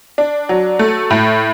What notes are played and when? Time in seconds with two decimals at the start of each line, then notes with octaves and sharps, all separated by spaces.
0.18 D4
0.49 F#3
0.79 A3
1.10 A2